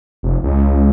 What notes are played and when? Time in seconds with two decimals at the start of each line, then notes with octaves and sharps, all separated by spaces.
0.23 F1
0.43 C#2